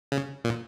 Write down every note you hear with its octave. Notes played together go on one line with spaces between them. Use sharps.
C#3
A#2